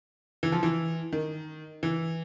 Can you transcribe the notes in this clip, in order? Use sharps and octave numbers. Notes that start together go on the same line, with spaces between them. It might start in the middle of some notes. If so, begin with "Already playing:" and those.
E3
F3
E3
D#3
E3